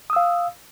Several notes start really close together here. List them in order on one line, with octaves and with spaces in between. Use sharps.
D#6 E6 F5